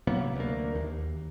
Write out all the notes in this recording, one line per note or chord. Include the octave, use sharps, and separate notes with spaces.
C3 F#3 A#3 B3
D2 A#3
D#2